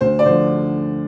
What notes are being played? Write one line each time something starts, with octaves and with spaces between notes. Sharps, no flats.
D2 C5
D5
D3 F3 C5